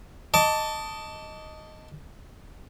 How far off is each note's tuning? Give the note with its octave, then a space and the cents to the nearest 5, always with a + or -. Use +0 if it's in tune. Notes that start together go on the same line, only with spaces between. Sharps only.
D#5 +0 A5 +10 D6 -25